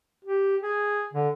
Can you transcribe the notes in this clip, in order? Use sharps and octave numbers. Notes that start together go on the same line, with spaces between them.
G4
G#4
D3